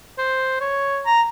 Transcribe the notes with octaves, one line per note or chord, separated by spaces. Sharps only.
C5
C#5
A#5